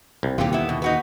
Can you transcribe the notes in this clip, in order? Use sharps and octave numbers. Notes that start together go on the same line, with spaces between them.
C2
D#2 A#2 D3 F4 G4
B3 E4
B2
D#4 F#4 B4